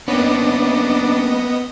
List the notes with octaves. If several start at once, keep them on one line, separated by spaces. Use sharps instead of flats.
A#3 B3 C#4 D4 D#5